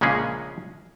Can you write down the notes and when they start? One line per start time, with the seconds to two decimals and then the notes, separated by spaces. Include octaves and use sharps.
0.01 A#1 C#3 G#3 A#3 C#4 G#4